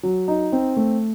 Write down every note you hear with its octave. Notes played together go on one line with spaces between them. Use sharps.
F#3
D#4
C4
A3